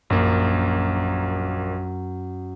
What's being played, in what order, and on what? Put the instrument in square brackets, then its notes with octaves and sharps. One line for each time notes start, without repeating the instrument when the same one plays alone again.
[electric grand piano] A#1 A#3 [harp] F#2